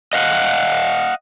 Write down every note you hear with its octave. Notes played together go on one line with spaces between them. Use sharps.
D#5 F5 F#5